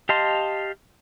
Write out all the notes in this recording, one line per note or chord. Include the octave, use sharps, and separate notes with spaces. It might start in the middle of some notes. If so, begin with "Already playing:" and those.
G4 D#5 F5 A5 C6